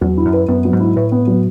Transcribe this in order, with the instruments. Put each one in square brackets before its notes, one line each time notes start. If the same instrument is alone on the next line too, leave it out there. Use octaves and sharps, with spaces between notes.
[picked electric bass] E2 [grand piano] F#3
[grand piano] E4
[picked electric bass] F#2
[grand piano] B4
[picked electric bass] F#2 [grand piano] B3
[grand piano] F#3
[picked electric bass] G#2
[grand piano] E4
[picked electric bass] A2 [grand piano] B4
[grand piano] B3
F#3